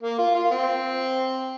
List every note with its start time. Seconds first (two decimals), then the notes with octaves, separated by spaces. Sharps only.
0.03 A#3
0.19 F4
0.35 F4
0.51 C4